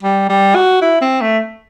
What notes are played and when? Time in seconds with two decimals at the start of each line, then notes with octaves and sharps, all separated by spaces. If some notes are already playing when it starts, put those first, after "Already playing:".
0.03 G3
0.29 G3
0.55 F#4
0.82 E4
1.01 C4
1.21 A3